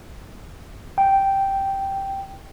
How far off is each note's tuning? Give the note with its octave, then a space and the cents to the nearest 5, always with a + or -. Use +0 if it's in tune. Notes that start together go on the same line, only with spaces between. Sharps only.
G5 -5